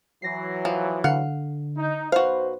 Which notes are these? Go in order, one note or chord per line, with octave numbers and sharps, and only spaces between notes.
E3 F#3 A#6 C7
F3
D3 F5 F#5
D#4
B1 F#4 B4 C5 F5